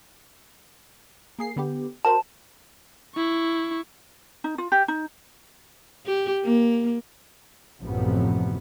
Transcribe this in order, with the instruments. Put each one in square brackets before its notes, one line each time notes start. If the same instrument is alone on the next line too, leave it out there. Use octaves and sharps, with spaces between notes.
[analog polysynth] A#3 G#4 C7
D3 B3 G4
[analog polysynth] F#4 A#4 C5 [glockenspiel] A5
[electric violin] E4 C#6
[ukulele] D#4
F4
G4
D#4
[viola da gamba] G4
A#3
[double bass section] A1 F#2 A2 C3 F3 B3